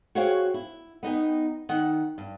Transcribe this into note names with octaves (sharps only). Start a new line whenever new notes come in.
F#4 G#4 C5 C#5 F5 G5
E4
B3 D#4 G4
D#3 F#5
G2